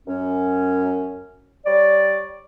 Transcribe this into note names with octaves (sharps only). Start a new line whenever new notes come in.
F#2 C#4
G3 C#5 D5